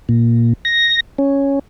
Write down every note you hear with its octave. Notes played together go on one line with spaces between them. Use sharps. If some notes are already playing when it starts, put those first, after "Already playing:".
A#2
A#6
C#4